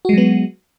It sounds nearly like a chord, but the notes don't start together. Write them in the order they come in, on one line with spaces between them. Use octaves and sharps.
F#4 G#3 F#3 B3